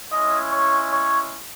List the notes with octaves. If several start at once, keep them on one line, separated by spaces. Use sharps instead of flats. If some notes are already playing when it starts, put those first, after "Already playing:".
G#3 C#4 E4 D#5
C#5
C#5